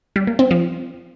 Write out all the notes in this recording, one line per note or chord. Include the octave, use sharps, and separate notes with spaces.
G3
A#3
C4
F3